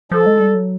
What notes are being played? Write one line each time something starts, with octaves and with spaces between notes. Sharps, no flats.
F3 A4
G#3
G3
F#3